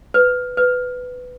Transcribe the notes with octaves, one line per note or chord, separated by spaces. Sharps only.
B4
B4